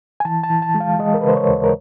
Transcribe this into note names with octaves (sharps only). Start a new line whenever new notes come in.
G#5
E3 A5
A5
E3
A5
G#3
F5
G#3 D#5
A#4
B4
C#3 C5
C#5
D#2
A#4